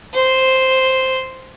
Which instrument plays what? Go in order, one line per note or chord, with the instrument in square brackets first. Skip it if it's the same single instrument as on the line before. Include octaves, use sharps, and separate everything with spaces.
[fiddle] C5